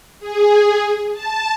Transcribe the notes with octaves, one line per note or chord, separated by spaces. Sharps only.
G#4
A5